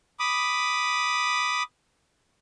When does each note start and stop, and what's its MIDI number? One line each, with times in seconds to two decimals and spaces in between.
0.20 1.63 83
0.20 1.63 86
0.20 1.63 87